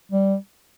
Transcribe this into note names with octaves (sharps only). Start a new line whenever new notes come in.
G3